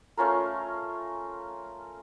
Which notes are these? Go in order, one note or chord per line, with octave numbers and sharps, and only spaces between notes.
A3 C#4 F4 A#4